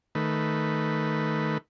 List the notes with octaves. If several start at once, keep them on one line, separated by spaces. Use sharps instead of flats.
D#3 A3 B4